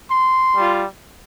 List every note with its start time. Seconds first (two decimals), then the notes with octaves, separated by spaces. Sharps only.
0.11 C6
0.54 G3 F4